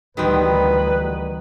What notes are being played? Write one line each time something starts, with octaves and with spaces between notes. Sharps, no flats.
D2 D#3 E3 G3 B3 C4 F#4 B4